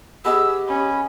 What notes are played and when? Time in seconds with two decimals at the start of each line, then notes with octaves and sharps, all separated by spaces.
0.25 B3 G4 G#4 D#5 E6
0.68 C#4 B5